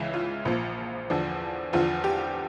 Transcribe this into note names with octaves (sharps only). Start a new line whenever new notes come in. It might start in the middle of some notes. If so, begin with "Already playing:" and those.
Already playing: C#2 C#3 E3 E4
F4
A#1 A#2 F3
E2 D3 F3
E2 D3 F3 F4
G4